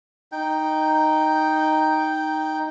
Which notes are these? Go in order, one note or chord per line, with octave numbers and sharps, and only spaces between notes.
D#4 G5